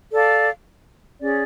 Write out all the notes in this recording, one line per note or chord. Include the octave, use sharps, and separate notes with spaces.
A4 D5 F5
C#4 G#4 D5